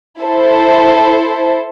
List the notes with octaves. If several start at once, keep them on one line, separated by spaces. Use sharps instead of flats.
E4 A4 C5